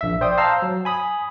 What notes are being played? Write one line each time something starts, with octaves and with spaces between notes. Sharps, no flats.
A#1 E5
C5 D5 G5 D#6
C5 F5 A5 A#5 E6 C7
F#3
G#5 B5 D#6